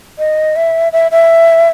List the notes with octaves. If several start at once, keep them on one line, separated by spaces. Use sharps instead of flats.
D#5
E5
E5
E5